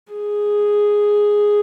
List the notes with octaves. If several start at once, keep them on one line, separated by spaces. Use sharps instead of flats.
G#4